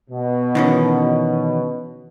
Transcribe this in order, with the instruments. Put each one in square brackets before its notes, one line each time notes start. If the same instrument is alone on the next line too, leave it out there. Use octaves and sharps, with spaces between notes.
[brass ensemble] B2
[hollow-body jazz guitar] D#3 E3 C#4